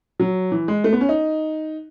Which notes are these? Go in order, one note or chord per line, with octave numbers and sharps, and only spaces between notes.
F#3
E3
G#3
A3
B3
C#4
D#4